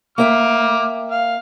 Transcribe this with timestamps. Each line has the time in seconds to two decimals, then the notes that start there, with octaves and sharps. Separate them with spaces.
0.18 A#3 E5 G5 D6 F6
1.11 F5